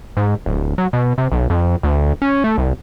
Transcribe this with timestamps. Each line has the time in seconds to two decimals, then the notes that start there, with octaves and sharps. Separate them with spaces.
0.17 G#2
0.46 D1
0.78 F#3
0.93 B2
1.18 C3
1.32 B1
1.50 F2
1.83 D2
2.22 C#4
2.44 A3
2.58 C2